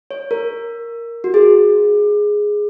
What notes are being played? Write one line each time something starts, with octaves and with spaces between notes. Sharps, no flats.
C#5
A#4
F#4
G#4